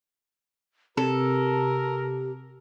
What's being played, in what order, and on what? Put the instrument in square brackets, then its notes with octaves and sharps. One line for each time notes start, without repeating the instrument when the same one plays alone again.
[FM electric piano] C3 [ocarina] G4 [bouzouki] A4 [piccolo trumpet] A#4